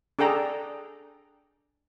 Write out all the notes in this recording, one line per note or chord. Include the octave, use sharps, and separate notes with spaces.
D4 G#4 A4 G5 A#5